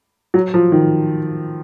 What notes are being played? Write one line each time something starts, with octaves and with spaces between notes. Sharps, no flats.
F#3
F3
D#3